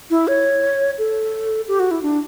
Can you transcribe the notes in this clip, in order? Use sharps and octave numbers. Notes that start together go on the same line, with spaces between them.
E4
C#5
A4
G4
F#4
E4
D4